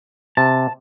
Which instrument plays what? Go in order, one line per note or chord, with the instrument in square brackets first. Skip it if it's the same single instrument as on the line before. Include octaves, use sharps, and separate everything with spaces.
[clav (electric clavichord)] C3 [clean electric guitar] A5